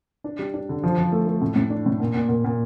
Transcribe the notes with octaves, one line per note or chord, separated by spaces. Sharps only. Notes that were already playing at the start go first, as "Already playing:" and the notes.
D4
G3
D4
D3
F3
F3
A3
A3
A2
A2
D4
A2
A#2
A#2
A#2
A#2